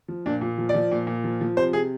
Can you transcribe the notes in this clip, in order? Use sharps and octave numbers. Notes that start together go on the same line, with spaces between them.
F3
A#2 D4
A#2
F3
D5
F3
A#2
A#2
F3
F3
C3 C5
C3 G#4